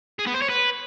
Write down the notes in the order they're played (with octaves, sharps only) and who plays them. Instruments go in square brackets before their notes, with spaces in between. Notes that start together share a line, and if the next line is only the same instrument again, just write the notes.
[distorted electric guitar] G#4
B3
C5
C#5
B4